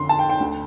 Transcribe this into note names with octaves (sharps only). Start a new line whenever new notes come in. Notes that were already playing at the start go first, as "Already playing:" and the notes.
Already playing: F2 D3 C6
A5
G5
G5
D2 D3